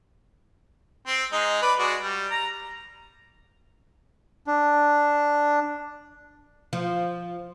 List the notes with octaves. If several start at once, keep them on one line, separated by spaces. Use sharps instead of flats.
C4
G#3 D#4
B4 D5
G#3 F#4 D5
G3
A#5
D4
F3